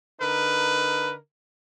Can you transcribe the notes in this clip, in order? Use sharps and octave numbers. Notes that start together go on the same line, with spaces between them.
D3 D#4 A#4 B4